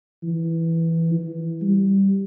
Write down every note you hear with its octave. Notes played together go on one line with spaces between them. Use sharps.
E3
E3
G3